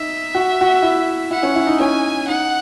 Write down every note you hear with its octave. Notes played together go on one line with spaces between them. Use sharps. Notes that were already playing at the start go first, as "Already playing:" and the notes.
Already playing: D#4 E5
F#4
F#4
E4
E4 F#5
C#4
E4
D#4
C#4 G#5
D#4 F#5